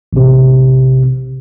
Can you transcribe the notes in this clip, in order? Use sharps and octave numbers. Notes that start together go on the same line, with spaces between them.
A1 C3